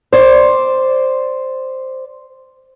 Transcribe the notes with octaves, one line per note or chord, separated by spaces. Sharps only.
C5 D5